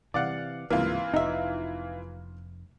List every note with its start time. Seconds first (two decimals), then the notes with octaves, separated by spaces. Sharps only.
0.14 C3 E3 D5 F5 F#5
0.70 C#2 G#2 C3 E3 A#3 F4
1.14 F1 D#4 E5